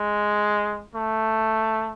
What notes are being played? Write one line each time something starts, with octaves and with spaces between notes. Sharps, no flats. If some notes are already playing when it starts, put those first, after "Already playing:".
Already playing: G#3
A3